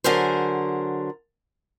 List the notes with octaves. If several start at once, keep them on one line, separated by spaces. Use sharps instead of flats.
D3 F#3 G#4 A#4 C5